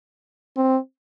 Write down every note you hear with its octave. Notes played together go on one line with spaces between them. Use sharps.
C4